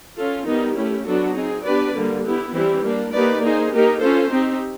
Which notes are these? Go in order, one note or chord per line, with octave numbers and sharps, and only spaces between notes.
C#4 F4 A4
D#3 G3 B3 D#4 G4
A3 C#4 E4 G4
F#3 B3 D4 F#4 A4
C4 D#4 G#4
B3 D4 G4 B4 D5
D3 G3 A#3
B3 E4 G4
E3 G3 C4 E4 G4
G3 A#3 D4
A#3 D#4 G4 B4 D5
A#3 D#4 G#4 C5
A#3 D#4 G4 A#4
C#4 F4 A4 C5
C4 D#4 G4